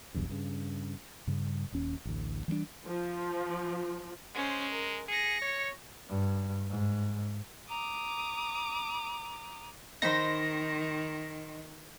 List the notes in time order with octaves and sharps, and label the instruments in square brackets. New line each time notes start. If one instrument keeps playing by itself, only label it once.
[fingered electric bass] F1 B1 E2 G2
G2 C#3
G2 C#3 G3
D#1 D#2 C#4
A1 D2
E3 G3 A3 D4
[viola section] F3
[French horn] G#3 [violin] C#4 C5
[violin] A#4
[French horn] G#4 [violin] A#6 C#7
[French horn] C#5
[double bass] G2
G#2
[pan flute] A#5 [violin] D6 D#6
[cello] D#3 [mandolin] D#4 C5 B5 [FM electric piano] A#6